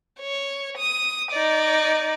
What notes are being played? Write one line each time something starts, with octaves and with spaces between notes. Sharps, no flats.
C#5
D#6
D#4 D5